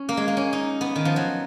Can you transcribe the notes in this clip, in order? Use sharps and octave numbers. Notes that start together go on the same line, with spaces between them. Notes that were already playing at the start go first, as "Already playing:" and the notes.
Already playing: C#4
A#3
G#3
A#3
C#4
D#4
B3
D#3
F3
F#3